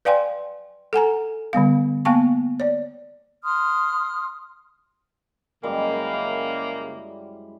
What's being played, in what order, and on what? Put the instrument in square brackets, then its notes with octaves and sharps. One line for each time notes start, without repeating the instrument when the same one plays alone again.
[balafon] B4 D5 F5 G5 G#5 C6
A4 F#5 G#5 A#5
D3 G3 B3 F5
A#3 B3 F5 G5 A5 C#6
C#5 D5
[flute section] C6 D#6 F6
[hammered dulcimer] F#2 G3 G#3 [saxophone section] C#3 A#3
[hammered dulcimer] E4